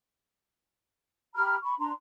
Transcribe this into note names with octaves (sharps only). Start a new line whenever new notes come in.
G4 A#5 B5 F6
B5 C#6
D4 A#5 C6